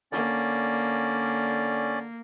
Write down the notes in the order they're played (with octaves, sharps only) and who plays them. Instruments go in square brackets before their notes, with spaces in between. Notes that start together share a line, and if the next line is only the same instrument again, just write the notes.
[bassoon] D3 [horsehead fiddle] A#3 [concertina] C#4 D5